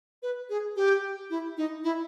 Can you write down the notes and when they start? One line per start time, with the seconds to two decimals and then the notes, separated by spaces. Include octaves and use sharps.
0.23 B4
0.50 G#4
0.76 G4
1.30 E4
1.57 D#4
1.84 E4